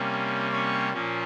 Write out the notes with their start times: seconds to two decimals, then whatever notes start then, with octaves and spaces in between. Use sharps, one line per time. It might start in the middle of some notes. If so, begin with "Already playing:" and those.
Already playing: C3 G3 A#3 C#4
0.52 C#4 C#5
0.93 A#2 F3 A#3 C#4